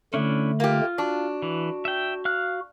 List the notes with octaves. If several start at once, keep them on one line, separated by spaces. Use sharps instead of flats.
D3 A3 C#4 D4 E4
A#3 F4 G4
D4 F#4
E3
E5 G5
F5 F6 F#6